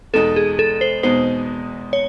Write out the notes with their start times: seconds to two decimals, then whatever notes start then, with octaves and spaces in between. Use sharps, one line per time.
0.13 E2 B2 G#3 B3 D#4 A4
0.36 G#4
0.59 A4
0.81 C5
1.03 E2 B2 G#3 B3 D#4 C5
1.93 C#5